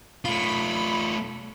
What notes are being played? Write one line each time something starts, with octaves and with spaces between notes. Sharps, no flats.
A3 F4 B5